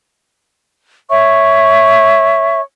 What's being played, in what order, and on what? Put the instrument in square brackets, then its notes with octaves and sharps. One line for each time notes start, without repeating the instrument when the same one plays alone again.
[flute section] C#5 E5 C#6